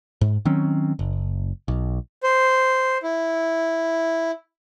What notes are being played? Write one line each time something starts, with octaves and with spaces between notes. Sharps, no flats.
G#2
D#3 F#3 C4 C#4
F#1
B1
C5
E4